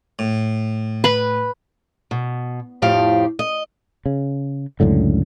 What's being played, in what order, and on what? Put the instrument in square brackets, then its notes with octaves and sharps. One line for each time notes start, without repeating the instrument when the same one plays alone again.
[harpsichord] A2
[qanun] B4 B5
[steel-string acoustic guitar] B2
F2 A2 F3 G4 F5
D#5
[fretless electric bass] C#3
C#2 F#2 A2 D3